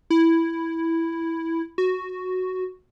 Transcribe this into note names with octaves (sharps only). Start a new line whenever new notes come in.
E4
F#4